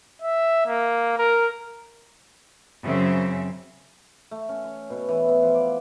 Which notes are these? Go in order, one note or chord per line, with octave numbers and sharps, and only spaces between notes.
E5
A#3
A#4
F#2 C#3 C4 C#4 E5
A3
C#4
C#5
B2
E3
B3
F3
D5